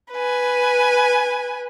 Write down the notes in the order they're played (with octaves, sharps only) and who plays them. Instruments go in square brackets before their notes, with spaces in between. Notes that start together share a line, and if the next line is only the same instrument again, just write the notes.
[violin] B4 G#5